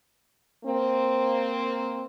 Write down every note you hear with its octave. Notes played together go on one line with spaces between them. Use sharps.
A#3 C4